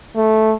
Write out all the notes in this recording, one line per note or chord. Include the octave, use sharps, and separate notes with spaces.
A3